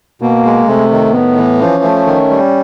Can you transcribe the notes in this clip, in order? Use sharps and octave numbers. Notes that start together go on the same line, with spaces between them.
B2 A#3
G#3
C3 A3
D#3
A2 B3
E3
F3 C#4
A3
D#3
G3